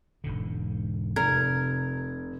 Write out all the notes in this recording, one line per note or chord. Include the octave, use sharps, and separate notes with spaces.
E1 G#2 D3
F1 C3 A#4 G#6